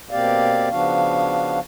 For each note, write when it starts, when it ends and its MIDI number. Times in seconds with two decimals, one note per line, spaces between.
0.11 0.69 47
0.11 0.69 58
0.11 0.69 60
0.11 0.69 67
0.11 0.69 74
0.11 0.69 77
0.70 1.59 49
0.70 1.59 53
0.70 1.59 59
0.70 1.59 62
0.70 1.59 66
0.70 1.59 77